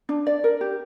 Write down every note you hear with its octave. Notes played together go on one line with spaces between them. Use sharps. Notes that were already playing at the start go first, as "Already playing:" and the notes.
D4
D5
A#4
G4